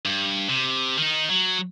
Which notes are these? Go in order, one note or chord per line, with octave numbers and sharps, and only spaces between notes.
G2
C3
D#3 D#4
F#3